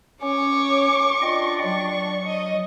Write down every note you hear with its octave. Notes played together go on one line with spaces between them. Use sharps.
C#4 C#5 C#6 D6
D4 F4 D#5 G5
F#3 C#6
D#5